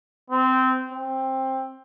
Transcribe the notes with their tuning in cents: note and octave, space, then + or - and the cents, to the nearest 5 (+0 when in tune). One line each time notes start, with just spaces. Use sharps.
C4 -15
C4 +15